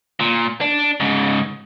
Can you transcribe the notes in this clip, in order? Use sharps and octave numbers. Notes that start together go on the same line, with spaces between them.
A#2
D4
G#2 C#3